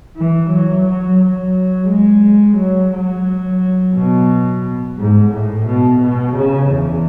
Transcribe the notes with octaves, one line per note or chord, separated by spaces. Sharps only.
E3
F#3
F#3
F#3
G#3
F#3
F#3
B2
G#2
A2
B2
B2
C#3
E2